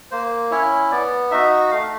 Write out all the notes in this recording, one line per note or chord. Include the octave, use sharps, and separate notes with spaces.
A#3 C5
C#4 E4 C#5
B3 D5
D#4 F#4 E5
A3 F5